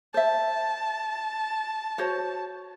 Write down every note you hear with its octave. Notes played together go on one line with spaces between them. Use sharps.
C5 E5 A5
F#4 C5 C#5